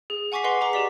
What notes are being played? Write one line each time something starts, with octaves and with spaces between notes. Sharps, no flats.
G#4
F#5 G#5 C#6 D6 B6 C7
B4 D#5 F#5 C6 C7
G#4 A#5 D6
G4 D5 B6